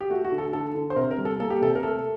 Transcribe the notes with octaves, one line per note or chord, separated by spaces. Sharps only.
G4
A3 F#4
F#4
D3
A4
D3 A4
D3
C5
C3 A#4
A#4
G3
A4
A#3 A4
G4
C3 A4
A#4
A3 A4